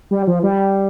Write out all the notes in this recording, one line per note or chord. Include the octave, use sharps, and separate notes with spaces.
G3
F3
G3